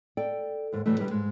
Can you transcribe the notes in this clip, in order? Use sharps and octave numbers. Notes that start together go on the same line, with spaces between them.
A4 D5 G5
D#2 G#2
A2 C#3 E3 F#3 G3 A3
D3 G3 G4 G#4 B4
G#2 G#3